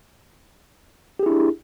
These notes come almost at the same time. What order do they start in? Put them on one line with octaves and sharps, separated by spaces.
G4 G#4 E4 D4